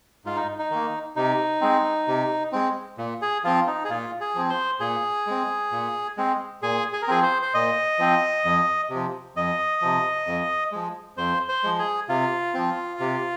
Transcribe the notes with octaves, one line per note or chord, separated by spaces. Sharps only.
G#2 F4
D#4
D#4
D#3 A#3
C3 D#4
G#3 C4
C3
G#3 C4
A#2
G#4
F3 C4 F4
D#4
G#4
A#2 F4
G#4
F3 C4
C5
A#2 G#4
G#3 C4
A#2
G#3 C4
A#2 G#4
G#4
A#4
F3 C4 G#4
C5
C5
A#2 D#5
F3 C4
F2
C3
F3
F2 D#5
C3 F3
F2
F3 G#3
F2 C5
C5
F3 G#3
G#4
C3 F4
F3 C4
C3